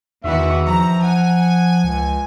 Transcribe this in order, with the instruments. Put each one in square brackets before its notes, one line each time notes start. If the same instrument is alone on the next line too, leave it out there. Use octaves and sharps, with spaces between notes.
[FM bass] E2 [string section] D#3 E3 F#4 [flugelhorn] E5
[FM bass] F3 [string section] A#5
[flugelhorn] F#5 [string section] G#5
[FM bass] C#2